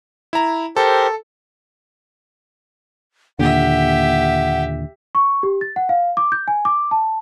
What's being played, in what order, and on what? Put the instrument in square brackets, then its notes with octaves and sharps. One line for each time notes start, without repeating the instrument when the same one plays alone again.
[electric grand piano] E4 A#5
[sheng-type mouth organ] G4 A#4 C5 [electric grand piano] A4
[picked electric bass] D#2 A#2 D3 [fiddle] G4 E5 [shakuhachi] F#5
[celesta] C#6
G4
A6
F#5
F5
D6
G6
G#5
D6
A5